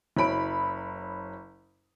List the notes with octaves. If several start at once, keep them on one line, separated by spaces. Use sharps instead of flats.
F#1 F#3 B5 D7